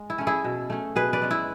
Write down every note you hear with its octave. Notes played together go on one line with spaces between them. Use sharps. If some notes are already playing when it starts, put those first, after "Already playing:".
Already playing: G#3
E4
A3 C#4
E4 G#4
B2
A3 C#4
B2 G#4 B4
B4 D5
G#3 C#4
E4